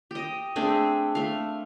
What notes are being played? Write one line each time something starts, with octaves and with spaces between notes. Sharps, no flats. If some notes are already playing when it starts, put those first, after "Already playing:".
G4 D#5
A3 C4 D4 G#4
A3 F5